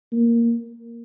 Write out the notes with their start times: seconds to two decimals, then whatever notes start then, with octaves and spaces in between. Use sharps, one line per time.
0.12 A#3